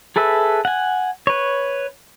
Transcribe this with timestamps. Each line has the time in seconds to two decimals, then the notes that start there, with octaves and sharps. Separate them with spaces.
0.16 G#4 A4 B4 E5
0.65 F#5 G#5
1.27 B4 C#5